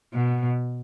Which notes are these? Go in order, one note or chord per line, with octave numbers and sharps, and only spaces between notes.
B2